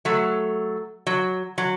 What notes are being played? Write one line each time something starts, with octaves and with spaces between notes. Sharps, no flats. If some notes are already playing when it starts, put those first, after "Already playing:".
F#3 A3
F#3
F#3